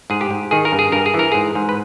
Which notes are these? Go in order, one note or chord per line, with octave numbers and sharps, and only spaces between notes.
G#2 G#4
G4
G#2
D#3 G#4
A#4
G2
G#4
G2 A#4
G#4
E3 A#4
G#2 G#4
G#2
B4